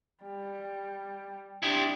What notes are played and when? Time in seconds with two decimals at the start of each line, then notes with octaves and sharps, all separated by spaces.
0.22 G3
1.63 D4 E4 G4